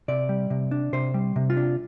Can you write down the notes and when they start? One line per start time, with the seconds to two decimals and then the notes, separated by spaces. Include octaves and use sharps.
0.08 C3 D5
0.29 G3
0.50 C3
0.71 D4
0.93 C3 C5
1.14 G3
1.36 C3
1.50 F4
1.57 D4